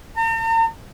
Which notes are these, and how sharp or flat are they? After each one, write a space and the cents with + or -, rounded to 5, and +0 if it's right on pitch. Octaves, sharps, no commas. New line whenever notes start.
A#5 -45